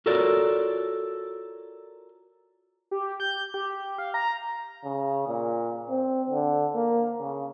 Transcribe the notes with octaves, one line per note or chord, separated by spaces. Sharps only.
F4 F#4 A4 A#4 C#5 D5
G4
G6
G4
F5
A#5
C#3
A#2
C4
D3
A#3
C#3